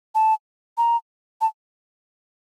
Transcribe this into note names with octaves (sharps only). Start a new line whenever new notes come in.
A5
A#5
A5